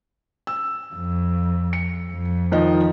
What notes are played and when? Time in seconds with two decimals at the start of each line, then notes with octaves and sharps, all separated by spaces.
0.47 E6
0.94 F2
1.73 C#7
2.11 F2
2.52 D#3 F3 D#5